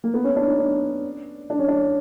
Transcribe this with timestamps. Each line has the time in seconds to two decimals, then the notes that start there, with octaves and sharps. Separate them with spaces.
0.04 A#3
0.14 B3
0.24 C#4
0.36 D4
0.47 D#4
0.58 D4
1.50 D4
1.59 C#4
1.68 D4